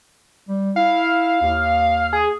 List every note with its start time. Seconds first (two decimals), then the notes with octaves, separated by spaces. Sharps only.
0.49 G3
0.76 E4 F5
1.42 D#2
2.13 G#4